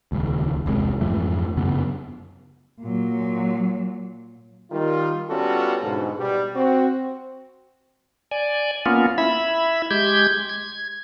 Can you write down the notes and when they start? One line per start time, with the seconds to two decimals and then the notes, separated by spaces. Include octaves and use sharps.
0.12 D#1 C#2
0.66 E1 C2 C3 G#3
1.01 F2 G#2 E3 A3
1.57 F#2 C#3 B3
2.81 A#2 F#3
4.71 D#3 G3 F4
5.29 G3 B3 C#4 F4 F#4 A4
5.83 G#2 B2 D3
6.17 B2 G3
6.55 C4 F#4
8.31 D5 G#5
8.86 A#3 B3 C#4 F4
9.18 E4 E5 B5
9.91 G#3 G4 G6 G#6
10.49 G#6